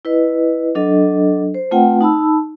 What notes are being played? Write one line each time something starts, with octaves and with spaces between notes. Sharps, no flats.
E4 B4 D#5
F#3 D4 A4 D#5
C5
A3 C4 F4 B4 F#5 G5
D#4 A5 B5 E6